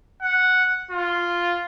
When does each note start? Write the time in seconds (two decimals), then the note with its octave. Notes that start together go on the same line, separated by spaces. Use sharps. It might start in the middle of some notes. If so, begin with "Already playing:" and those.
0.22 F#5
0.91 F4